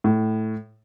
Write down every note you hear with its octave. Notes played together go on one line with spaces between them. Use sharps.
A2